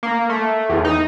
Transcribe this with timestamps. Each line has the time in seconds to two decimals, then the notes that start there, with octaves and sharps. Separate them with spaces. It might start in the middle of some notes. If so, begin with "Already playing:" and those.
0.03 A#3
0.30 A3
0.69 E2
0.85 D#4